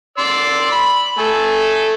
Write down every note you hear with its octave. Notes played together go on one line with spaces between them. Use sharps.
D5 C6 E6
B5
A3 A4 G#5